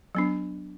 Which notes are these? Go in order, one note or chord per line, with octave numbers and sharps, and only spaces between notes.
F#3 B3 D4